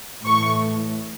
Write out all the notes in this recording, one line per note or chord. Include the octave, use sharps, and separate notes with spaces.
A2 E3 A3 C#6